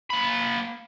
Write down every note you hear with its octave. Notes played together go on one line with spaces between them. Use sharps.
A#3 B5